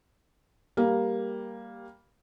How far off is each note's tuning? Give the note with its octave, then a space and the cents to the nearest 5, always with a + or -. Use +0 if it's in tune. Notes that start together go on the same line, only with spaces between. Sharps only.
G3 +0 A#3 +0